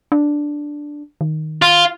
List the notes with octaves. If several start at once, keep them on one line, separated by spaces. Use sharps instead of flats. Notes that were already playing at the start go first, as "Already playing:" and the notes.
D4
D#3
F4